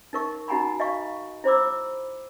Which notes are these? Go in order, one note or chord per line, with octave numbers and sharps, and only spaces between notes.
D#4 A#4 C#6
D#4 F#4 F#5 G#5 A#5 B5
D#5 F5 C#6
E4 C5 B5 D6 E6